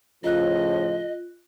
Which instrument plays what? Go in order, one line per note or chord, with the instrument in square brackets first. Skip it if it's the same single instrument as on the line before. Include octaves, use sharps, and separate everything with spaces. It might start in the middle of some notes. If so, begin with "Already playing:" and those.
[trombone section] A2 C#3 F3 [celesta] F4 F#6 [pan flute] D#5